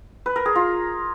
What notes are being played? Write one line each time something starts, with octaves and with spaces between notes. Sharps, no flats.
B4
A#4
G#4
F4